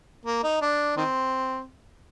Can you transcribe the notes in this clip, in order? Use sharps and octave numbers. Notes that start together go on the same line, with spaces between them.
A#3
D#4
D4
D#3 C4